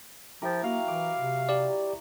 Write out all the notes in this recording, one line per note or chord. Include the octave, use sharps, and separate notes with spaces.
F3 E4 G4 A#4
F#3 A#3 F5
E3 D6
C3
G4 D5